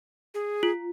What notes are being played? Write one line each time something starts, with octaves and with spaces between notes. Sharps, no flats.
G#4
F4